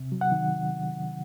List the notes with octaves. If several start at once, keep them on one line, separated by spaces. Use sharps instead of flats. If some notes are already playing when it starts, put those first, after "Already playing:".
Already playing: C3
F#3
F#5
D#3